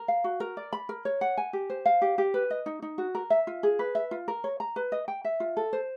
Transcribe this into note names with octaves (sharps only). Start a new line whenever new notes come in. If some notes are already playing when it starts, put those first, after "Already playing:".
Already playing: A#4
F5
F#4
A#4
D5
B5
A#4
C#5
F#5
G#5
G4
C5
F5
G4
G4
B4
D#5
D#4
D#4
F#4
A#4
E5
F4
G#4
B4
E5
F4
A#4
C#5
A#5
B4
D#5
G5
E5
F4
A4
C5